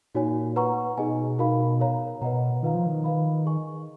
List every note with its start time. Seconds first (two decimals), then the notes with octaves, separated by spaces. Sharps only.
0.15 A#2 D#4 F#4 C#5 G#5
0.56 B4 F#5 A#5 C#6
0.97 B2 D#4 G#4 D#5 G#5
1.39 D#4 F#4 A#4 F5 B5
1.80 A#4 C#5 F5 A#5
2.21 B2 B4 D#5 F#5 A#5
2.62 D#3 F4 B4 F5 A#5
2.74 F3
2.86 D#3
3.04 B4 F5 B5
3.45 G#4 D#5 G#5 C#6